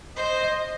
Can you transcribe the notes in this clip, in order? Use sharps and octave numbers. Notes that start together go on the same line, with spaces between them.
C5 D#5